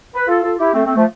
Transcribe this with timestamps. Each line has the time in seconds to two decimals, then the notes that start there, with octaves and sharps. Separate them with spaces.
0.15 B4
0.27 F4 A4
0.42 F4 A4
0.58 E4 G4
0.73 A3 C4
0.85 A3 C4
0.95 F3 A3